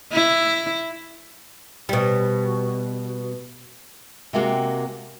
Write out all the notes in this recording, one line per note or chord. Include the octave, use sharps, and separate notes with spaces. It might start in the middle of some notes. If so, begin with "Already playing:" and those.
E4
B2 G3
C3 G#3 A#3 F#4 G5